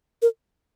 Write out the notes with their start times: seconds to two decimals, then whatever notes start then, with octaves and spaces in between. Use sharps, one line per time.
0.22 A#4